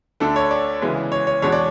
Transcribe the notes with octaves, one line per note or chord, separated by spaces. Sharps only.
D2 D3 A3 D4 A4
C#5
D5
C#3 E3 G#3 B3
C#5
C#5
E2 B2 G#3 D4 C#5
D5